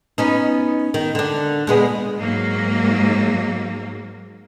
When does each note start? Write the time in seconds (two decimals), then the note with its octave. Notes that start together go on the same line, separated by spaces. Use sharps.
0.18 B3 C#4 D#4
0.94 D#3
1.15 D3 D4
1.67 A#2 G#3 B3
2.18 G#2 F#3 A#3